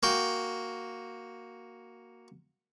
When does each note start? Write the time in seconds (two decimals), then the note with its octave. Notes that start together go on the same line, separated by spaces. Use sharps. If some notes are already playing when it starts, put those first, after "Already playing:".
0.03 A#3 F#4 G5